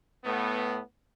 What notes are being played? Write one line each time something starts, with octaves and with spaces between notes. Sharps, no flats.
A2 A3 B3